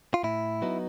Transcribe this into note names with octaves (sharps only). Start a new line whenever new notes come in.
F4
A2 E4
F#3 B3 D#4